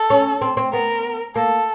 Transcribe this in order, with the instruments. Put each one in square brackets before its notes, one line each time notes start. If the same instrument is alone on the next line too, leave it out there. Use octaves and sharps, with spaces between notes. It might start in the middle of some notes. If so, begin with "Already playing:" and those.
Already playing: [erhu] A4
[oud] C#4
C4
C4
[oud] B3 [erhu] A#4
[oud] A#3 [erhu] A4